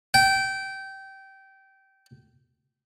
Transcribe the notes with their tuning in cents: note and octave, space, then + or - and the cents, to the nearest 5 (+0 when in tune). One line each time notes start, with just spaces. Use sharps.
G5 -20